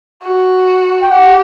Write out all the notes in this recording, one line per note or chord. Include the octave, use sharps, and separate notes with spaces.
F#4
G5
G4 F#5